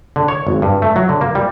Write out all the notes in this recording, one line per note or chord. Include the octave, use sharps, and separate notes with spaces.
D3
C#5
G#1
G2
A3
F#3
D3
A#3
G3